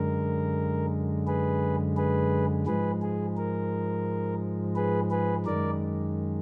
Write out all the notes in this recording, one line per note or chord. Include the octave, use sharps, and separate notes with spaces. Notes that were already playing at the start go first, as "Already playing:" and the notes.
Already playing: F#2 D3 G#3 A#4
G#4 B4
G#4 B4
G#2 F3 G#3 G#4 B4
G#4
A#4
G#4 B4
G#4 B4
F#2 D#3 G#3 A#4 D5